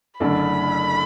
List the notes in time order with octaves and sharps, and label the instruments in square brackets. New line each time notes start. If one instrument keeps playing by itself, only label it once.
[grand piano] F#1 F#2 D3 A3 D4 [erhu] B5